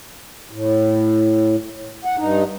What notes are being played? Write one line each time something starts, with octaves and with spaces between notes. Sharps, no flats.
A2
F#5
G2 D#4